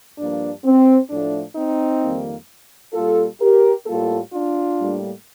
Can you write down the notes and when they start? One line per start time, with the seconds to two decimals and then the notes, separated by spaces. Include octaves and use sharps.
0.18 G2 F3 A#3 D4
0.64 C4
1.09 A2 F3 A3 D4
1.56 C4 D#4
2.02 F2 D#3 G3 A#3
2.93 A#2 G3 A#3 F4 A4
3.40 G4 A#4
3.86 A2 G3 A#3 F4 A4
4.32 D4 F4
4.78 A2 G3 A#3